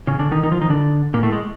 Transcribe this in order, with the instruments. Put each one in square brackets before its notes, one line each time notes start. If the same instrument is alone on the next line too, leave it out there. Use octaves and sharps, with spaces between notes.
[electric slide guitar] C#3 C#4
D3 D4
D#3 D#4
D#3 D#4
F3 F4
D#3 D#4
D3 D4
A#2 A#3
A2 A3
G#3